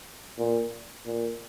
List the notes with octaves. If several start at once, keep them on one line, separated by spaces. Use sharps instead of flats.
A#2
A#2